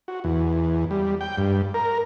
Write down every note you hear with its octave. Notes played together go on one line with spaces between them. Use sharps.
F#4
E2
G3
G5
G2
A#4